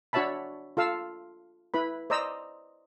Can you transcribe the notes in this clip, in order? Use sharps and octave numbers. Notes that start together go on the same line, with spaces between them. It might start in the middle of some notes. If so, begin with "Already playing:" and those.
D4 F#4 C#5 E5 A5 B5
F4 A4 F5 E6
E4 B4 B5
C5 D5 D#5 A#5 E6